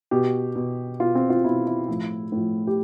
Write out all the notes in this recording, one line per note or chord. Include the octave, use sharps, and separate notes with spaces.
B2 G4
B2
B2 F4
C4
F4
B2 E4
E4
A2 F3
A2 F3
G4